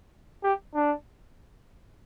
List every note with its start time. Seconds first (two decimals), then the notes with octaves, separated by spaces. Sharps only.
0.43 G4
0.74 D4